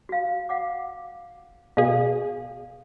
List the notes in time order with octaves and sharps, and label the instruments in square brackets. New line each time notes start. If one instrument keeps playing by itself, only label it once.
[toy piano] F#4 F5
F5 F#5 D6
[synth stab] B2 G#4 [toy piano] F5